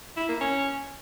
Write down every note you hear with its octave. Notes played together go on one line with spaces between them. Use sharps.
E4
A#3
C#4